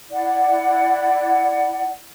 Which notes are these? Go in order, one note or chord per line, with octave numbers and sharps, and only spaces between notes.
E4 D5 F#5